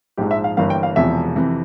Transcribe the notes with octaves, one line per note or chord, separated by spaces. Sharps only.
A#1 G#2 F3 G#3 G4
E5
F5
G1 G2 E3 A#3 F5
G5
F5
E1 E2 C3 F3 E5
F2 C3 E3